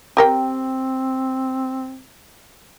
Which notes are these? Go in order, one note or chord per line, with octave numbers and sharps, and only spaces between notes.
C4 G4 A#4 G5